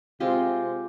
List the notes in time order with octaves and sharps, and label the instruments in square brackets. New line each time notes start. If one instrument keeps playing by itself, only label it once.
[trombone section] C3 C4 [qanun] G#3 F4 G4